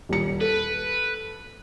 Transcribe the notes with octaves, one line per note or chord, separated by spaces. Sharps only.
D#1 C#7
A4 B4